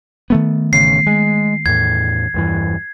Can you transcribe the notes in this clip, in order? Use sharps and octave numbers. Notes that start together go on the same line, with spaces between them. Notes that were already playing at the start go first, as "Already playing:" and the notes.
D#3 A3 B3
A1 C#3 C7
G#3
E2 A2 G#6
E2 G2 E3